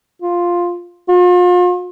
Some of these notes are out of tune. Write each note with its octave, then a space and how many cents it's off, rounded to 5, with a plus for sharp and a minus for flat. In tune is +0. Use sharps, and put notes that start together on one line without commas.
F4 +5
F4 +40